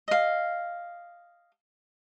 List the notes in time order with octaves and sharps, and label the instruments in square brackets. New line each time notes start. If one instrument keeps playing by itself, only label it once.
[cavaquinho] D#5 F5